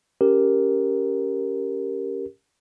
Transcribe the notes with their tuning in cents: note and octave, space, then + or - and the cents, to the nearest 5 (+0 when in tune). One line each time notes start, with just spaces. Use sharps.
C#4 +0 G4 +0 A#4 +0